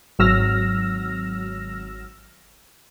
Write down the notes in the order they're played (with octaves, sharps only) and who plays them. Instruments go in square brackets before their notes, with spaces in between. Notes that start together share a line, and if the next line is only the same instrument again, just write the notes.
[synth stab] G#1 F#3 E6 F6 A#6